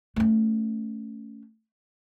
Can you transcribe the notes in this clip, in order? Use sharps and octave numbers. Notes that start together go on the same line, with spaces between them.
A3 C#4